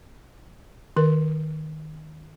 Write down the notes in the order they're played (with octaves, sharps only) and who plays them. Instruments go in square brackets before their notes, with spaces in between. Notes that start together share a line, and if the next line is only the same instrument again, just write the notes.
[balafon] D#3 A#4